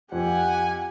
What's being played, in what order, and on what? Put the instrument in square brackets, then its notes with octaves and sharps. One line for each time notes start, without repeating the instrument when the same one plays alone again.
[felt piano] F2 [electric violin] G4 F#5 [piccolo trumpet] G#5